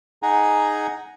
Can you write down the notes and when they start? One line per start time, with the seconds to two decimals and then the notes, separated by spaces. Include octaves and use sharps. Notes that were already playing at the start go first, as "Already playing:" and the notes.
0.23 D#4 G#4 F#5 G#5 A#5